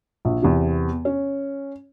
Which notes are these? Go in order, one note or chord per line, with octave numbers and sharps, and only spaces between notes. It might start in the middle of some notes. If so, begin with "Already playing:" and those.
A#1
E2 C3
C#4